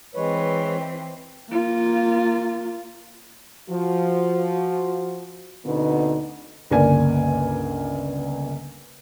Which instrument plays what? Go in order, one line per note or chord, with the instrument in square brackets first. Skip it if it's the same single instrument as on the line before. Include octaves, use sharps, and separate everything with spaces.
[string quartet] E3 C4 [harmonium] G#3 B4 C#5
[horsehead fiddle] A#3 F4
[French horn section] F3 F#4
D2 B2 D3 B3 C4 D#4
[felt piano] G1 C#2 A#3 D5 G#5